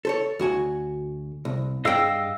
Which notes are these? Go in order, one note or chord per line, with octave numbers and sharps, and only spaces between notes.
A4 C5 C#5
D2 F#4 G#5
C2
G2 G#4 D#5 F5 G5 E6